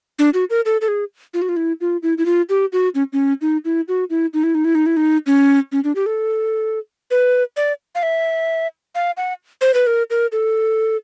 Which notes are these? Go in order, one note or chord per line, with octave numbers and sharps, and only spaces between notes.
D4
F#4
A#4
A4
A4
G#4
F4
F#4
F4
E4
F4
E4
E4
F4
G4
F#4
C#4
C#4
D#4
E4
F#4
E4
D#4
E4
D#4
E4
D#4
E4
D#4
C#4
C#4
D4
G4
A4
B4
D5
F5
E5
F5
F#5
C5
B4
A#4
A#4
A4